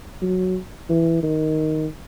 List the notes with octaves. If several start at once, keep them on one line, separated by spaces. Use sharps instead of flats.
F#3
E3
D#3